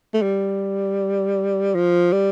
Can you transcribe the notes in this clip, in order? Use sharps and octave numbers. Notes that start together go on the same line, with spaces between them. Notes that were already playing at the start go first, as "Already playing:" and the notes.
A3
G3
F3
G3